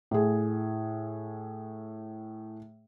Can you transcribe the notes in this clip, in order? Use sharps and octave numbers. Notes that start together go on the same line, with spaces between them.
A2 G#4